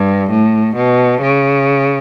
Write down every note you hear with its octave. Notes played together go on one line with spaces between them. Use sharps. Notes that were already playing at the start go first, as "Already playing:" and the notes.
Already playing: G2
A2
B2
C#3